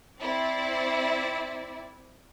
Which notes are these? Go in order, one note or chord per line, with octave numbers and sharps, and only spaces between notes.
C4 E4 D5